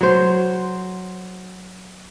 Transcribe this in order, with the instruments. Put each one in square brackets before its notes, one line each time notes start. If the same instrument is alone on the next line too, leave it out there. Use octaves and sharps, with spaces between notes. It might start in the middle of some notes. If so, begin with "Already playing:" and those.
[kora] F#3 C5